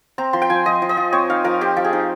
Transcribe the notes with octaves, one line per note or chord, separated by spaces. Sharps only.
C4 A#5
F3 C6
G5
F3 G#5
F3 D#5
F3
D#5
F3
C4 C#5
D#4 F5
F3 A#4
C4 G4
F3
G#4
D#4